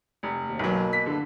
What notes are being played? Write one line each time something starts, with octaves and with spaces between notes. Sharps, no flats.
F1
D#2
B1 B2 F#3 A#3 B4
B6
D#2 D3 A4 B4